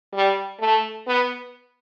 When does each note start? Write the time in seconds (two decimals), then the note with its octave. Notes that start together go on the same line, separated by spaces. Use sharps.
0.14 G3
0.61 A3
1.07 B3